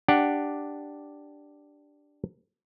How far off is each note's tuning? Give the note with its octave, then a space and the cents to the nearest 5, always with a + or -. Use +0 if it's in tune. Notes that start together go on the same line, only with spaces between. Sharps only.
D4 +0 G4 +0 F#5 +0